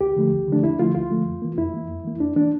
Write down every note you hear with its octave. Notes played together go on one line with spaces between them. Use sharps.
D2 G4
D3 F3 A3
D2
D3 F3 A3 D4
D2 E4
D3 F3 A3 F4
D2 F4
D3 F3 A3
F2
E3 A#3
F2 E4
E3 A#3
F2
E3 A#3
F2 D4
E3 A#3 D4